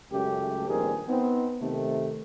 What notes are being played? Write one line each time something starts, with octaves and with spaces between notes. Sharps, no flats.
C#2 F#2 C#3 A3 G4
A#1 G2 D#3 C4 G#4 A#4
B3 C4 D#4
C3 D#3 A3